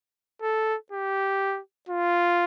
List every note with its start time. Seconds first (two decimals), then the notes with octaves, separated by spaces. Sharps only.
0.42 A4
0.92 G4
1.89 F4